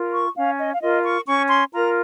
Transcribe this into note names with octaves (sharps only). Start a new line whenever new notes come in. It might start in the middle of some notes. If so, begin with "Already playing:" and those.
Already playing: F4 A#4
C#6
C#4 F5
D#5
F5
F4 A#4 D#5
C#6
C#4 C#6
C6
F4 A#4 A#5